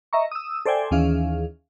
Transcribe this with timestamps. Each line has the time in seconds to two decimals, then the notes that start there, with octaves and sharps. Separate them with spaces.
0.13 D#5 E5 A#5 C#6
0.31 D#6 E6
0.65 A4 C5 D5 E5 G5 G#5
0.91 D#2 D#3 E3 C#4 G#4 F5